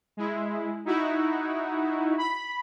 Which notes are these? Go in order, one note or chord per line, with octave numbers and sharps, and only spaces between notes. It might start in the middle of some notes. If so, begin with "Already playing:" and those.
G#3 E4
D#4 E4 F#4
B5